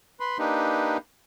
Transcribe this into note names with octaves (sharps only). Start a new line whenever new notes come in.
B4 B5 C6
A#3 D4 D#4 G4 B4